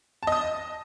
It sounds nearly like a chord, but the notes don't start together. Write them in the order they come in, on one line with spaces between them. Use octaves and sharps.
A5 D#5 D#6